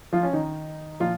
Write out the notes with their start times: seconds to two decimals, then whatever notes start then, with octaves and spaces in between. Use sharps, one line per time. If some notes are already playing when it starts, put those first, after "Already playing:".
0.13 F3 F4
0.23 C#4
0.33 D#3 D#4
1.00 A#2 F3 F4